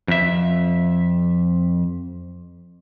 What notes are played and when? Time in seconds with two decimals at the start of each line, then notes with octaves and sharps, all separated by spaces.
0.08 F2 E5